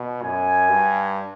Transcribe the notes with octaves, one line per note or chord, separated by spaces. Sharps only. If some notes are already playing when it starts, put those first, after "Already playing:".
Already playing: B2
F#2 G#5
G2